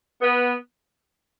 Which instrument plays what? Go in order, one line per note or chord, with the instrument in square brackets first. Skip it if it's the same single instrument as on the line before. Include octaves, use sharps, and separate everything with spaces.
[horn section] B3